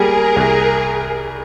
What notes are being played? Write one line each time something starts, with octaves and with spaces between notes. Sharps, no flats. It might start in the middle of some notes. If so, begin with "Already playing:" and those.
Already playing: G3 A#3 G#4 A#4
C2